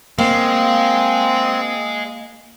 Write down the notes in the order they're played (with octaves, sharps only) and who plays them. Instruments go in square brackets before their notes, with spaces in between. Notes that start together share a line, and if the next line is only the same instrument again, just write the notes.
[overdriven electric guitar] G#3 [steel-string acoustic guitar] A#3 F5 [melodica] C4